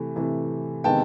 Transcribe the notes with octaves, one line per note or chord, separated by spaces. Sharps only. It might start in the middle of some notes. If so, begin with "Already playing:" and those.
Already playing: C3 E3 A3
C3 E3 A3
C3 D#3 G#3 B3 G5 A5